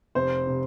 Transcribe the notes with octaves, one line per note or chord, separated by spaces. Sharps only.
F1 C5
C3